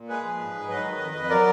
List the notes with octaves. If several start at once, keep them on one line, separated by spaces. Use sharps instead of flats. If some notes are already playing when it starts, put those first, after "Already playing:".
Already playing: A#2
G#3 G#4 B4
F3
G#2
G#2
F#3 B4 D#5
D#3
F2
F2
F#3 A#4 D5